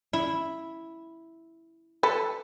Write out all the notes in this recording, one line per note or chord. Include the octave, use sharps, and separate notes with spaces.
E4
A4 B4